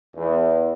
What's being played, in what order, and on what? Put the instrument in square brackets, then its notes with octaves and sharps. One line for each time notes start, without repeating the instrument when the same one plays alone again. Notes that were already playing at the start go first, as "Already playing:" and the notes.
[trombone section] E2